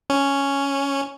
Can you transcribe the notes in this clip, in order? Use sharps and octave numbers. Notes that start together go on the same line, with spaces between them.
C#4